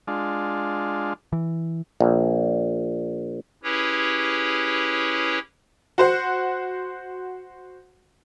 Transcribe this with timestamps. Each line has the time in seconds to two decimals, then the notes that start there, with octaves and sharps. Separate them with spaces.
0.07 G#3 D4 F4
1.33 E3
2.01 A#1
3.63 C#4 E4 G4 G#4 B4 C#5
5.98 F#4 C5 F#5